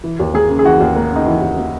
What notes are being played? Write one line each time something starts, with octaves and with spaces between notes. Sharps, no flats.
E3
D#2
A#3 G#4
C#3
G#4
E3 F#4
D#2
A#3
C#3 D#4
E3 E4
D#2
A#3